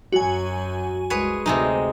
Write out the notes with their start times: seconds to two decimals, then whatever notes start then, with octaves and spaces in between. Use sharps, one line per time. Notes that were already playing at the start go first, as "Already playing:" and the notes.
0.12 F#2 F#3 F#4 G#5
1.10 C2 G#3 G#4 B4 C#5
1.46 D2 C3 G#3 D#4